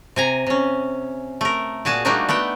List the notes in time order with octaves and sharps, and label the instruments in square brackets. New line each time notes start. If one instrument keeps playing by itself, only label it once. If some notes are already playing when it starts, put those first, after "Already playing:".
[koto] C3 G#5 A#5
C3 C#4
A3 A#4
A#2 F#4 G#4 A5
G3 A3 A#3 D4 D#4 F#4
A3 B3 F#5 G5